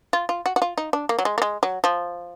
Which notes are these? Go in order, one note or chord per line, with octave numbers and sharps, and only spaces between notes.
F4
F4
F#4
F#4
F4
D#4
D4
A#3
F#3
G#3
A#3
G#3
F#3
F3